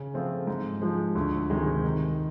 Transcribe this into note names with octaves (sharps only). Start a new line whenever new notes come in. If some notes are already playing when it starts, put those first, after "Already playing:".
Already playing: C#3
F3 A3 C4 F4
G#2
F3 G#3
D2
C3 D#3 G#3
D#3